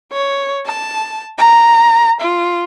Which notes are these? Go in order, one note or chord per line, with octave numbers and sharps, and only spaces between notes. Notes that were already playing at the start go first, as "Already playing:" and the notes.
C#5
A5
A#5
F4